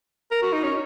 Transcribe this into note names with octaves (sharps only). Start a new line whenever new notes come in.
A#4
F#4
D#4
C#4